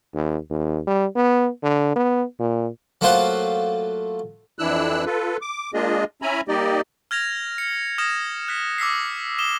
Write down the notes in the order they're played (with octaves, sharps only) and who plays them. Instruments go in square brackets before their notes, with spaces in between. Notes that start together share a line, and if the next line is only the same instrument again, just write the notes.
[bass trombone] D#2
D#2
G3
B3
D3
B3
A#2
[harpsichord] F#3 A3 A#3 F4 C5 F#5
[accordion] F2 E3 D4 E4 E6 F#6
F4 A4 B4
D6
G#3 A#3 D4 F4 G#4 D#5
C#4 E4 E5 G#5 A#5 B5
G3 A#3 D#4 G4 D5 D#5
[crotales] F6 G#6 A#6 F7
C#7
D#6 F6 G#6 A#6 E7
F#6 B6
D6 E6 B6 C7
D#6 E7 G7